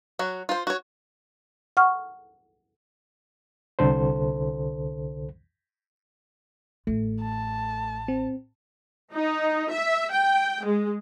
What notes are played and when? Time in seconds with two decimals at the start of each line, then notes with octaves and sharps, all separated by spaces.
0.19 F#3 F#4
0.49 F4 C5
0.67 F#4 C#5
1.77 F#5 C#6 F6
3.79 C2 D3 A4 C5
6.87 A1 A3 F4
7.22 A5
8.08 C4
9.13 D#4
9.71 E5
10.11 G5
10.64 G#3